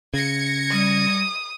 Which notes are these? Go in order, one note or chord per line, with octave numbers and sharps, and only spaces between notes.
C#3 G#6 A#6 C#7
G3 D#6